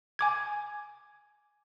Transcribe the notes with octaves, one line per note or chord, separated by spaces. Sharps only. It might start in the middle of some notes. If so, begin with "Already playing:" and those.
G#5 D6 G#6